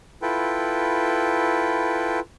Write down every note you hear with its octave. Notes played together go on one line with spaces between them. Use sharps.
E4 F4 A4 B4 G5